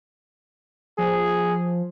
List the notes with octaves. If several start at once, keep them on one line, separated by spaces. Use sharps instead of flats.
F3 G#4